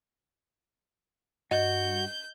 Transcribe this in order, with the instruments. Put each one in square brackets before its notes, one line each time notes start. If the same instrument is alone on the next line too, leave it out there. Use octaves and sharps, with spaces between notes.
[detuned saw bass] G2 [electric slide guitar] F#4 [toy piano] D#5 [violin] G6